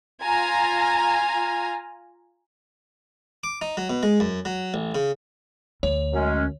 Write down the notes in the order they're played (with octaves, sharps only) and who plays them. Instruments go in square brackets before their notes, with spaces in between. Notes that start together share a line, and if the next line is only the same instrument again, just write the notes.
[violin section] F4 G#5 A#5
[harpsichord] D6
D#4
F#3
B2
G#3
F#2
F#3
A1
C#3
[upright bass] D2 [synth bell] C#5
[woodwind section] F#2 G#3 C#4